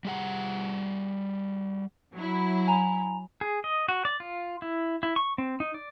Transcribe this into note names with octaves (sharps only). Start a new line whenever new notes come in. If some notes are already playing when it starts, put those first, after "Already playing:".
G3 G#4 F#5
F#3 E4
G#5 A#5 F7
G#4
D#5
F#4
D5
F4
E4
E4
C#6
C4
D#4
D5